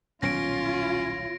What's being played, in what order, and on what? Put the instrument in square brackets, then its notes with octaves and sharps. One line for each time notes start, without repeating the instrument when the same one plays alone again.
[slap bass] D#1 B1 [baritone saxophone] C#4 [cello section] F4 [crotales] A#6 D7